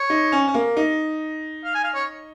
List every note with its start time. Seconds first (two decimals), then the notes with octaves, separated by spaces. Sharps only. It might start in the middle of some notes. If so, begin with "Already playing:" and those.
Already playing: C#5
0.10 D#4
0.32 C#4
0.48 C#4
0.54 A#3
0.77 D#4
1.65 F5
1.75 G#5
1.84 F5
1.94 C#5